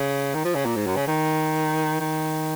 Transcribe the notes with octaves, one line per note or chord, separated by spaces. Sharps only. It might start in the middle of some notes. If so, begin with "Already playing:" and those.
Already playing: C#3
D#3
F3
C#3
A#2
G#2
F#2
C#3
D#3
D#3